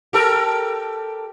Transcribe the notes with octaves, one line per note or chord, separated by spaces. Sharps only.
G4 A4 A#4